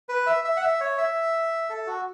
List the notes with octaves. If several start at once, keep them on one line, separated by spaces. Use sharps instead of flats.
B4
E5
E5
F#5
E5
C#5
E5
A4
F#4